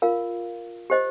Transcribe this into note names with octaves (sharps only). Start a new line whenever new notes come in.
F4 A#4 F5
G4 C5 D#5